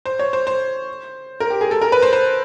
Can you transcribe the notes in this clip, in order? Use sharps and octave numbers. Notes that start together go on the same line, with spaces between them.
C5
C#5
C5
C5
A#4
G4
G#4
A4
A#4
B4
C5
C5